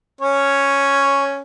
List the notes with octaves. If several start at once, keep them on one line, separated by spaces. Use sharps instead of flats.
C#4 C#5